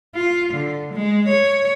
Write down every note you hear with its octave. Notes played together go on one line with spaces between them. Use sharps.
F4
D3
G#3
C#5